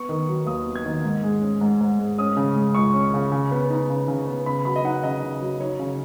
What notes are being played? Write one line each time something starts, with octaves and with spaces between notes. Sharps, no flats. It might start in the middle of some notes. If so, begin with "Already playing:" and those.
Already playing: B3 C#6
D#3
F#3
D#2 D#6
B3
G#6
D#3
G#2
G#3
C#4
G#2
G#2
G#3
C#4 D#6
C#3
G#3
C#2 C#6
C#4
C#3
C#3
B3
D#4
C#3
C#3
B3
C#3 B5
F#3 B5
D#5
D#4 F#5
C#3 D#5
C#3
F#3
D#4 C#5
C#3